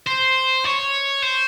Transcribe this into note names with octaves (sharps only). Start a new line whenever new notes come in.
C5
C#5
C5